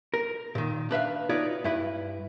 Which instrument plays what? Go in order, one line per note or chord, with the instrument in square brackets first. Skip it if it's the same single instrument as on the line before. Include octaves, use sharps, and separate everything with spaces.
[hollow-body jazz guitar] A#4
A#2 D#3
D4 B4 E5 F5
D#4 F4 F#4 B4 C#5 D5
G2 E4 B4